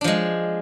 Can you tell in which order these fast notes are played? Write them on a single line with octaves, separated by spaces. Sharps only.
D4 F3 G#3